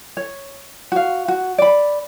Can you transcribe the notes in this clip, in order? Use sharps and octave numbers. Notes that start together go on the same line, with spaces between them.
C#5
F#4 F5
F#4
D5 B5